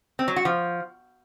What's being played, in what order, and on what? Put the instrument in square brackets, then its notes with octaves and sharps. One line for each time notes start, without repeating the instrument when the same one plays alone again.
[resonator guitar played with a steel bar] C4
F#3
F#4
F3